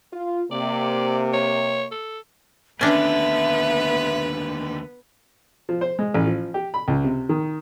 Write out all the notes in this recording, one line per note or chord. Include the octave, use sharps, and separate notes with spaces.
F4
C3 A#3 D5
C#5
A4
D#2 D3 B3 C#4 D4 B4 E5 G5
F3
C5
G#3
A1
F3
G4
B5
C#2
C3
D#3